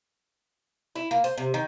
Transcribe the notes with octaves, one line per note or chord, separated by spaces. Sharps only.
E4
A#3
C5
C3
D#3